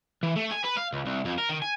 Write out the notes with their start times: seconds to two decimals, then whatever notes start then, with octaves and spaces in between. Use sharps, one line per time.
0.23 E3
0.36 A3
0.52 G#5
0.65 B4
0.77 F5
0.93 C#2
1.06 C2
1.25 F2
1.38 A#4
1.49 D#3
1.62 G#5